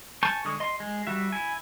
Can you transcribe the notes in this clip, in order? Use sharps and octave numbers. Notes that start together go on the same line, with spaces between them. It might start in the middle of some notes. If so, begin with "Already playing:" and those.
G#5 A5 C#6 G6
D3 G#3 C#6 D#6
D#5 C6
G#3
G3 F#4 E5
E4 G#5